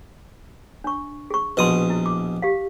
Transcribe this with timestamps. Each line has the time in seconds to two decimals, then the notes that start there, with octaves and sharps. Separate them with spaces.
0.84 D4 C#6
1.30 G#4 C#6
1.57 A#1 B2 B4 C6 D#6
1.90 E4
2.06 D6
2.42 G4 F5